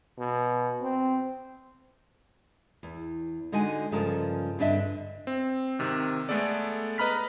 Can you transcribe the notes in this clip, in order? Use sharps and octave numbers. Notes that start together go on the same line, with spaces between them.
B2
C4
E2
D3 G#3 D#4 F#4 G#5
G2 C#3 F3 G#3 A4 A#4
G2 D3 D4 D#5 E5
C4
G#2 C3 D#3
G#3 A3 B3 A4 D5
B4 D#5 A#5 B5 F6 B6